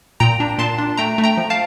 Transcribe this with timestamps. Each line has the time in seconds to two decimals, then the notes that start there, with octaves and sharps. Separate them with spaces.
0.20 A#2 G5 A#5
0.40 D4
0.58 A#2 A5 C6
0.78 D4
0.98 A3 G5 A#5
1.18 A3
1.24 G5 A#5
1.37 F3
1.50 F5 A5